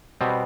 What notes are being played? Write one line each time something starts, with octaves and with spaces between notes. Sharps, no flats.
B2 G3 B3 C4